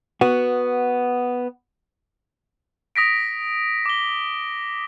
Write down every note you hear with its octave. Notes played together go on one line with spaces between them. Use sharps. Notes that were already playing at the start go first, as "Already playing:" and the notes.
B3 F#4
D#6 A#6 B6 D7
D6 G7